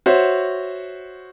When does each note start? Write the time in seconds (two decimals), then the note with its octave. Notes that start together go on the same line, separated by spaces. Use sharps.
0.06 F#4 C5 C#5 E5